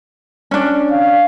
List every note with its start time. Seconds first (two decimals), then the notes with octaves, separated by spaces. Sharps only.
0.51 C#4 D4
0.92 F5